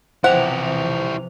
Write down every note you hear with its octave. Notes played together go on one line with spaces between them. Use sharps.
C3 E3 F3 E4 G4 C5 F#5 F7